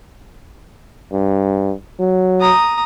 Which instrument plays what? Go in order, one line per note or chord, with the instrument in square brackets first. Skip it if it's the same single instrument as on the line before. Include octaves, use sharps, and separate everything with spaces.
[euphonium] G2
F#3
[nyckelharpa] A#5 D#6